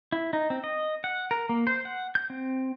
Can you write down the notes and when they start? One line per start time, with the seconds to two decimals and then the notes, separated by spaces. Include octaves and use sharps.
0.12 E4
0.33 D#4
0.50 C4
0.64 D#5
1.04 F#5
1.31 A#4
1.49 A#3
1.67 C5
1.85 F#5
2.15 G6
2.30 C4